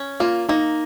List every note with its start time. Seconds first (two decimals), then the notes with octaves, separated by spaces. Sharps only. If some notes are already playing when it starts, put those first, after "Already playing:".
Already playing: C#4
0.20 A#3 F4
0.49 A#3 D#4